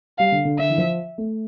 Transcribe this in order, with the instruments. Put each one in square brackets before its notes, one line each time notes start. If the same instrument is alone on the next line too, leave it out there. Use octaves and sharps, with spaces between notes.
[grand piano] G3 [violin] F5
[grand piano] D3
D3
[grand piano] D3 [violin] E5
[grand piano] E3
F3
A3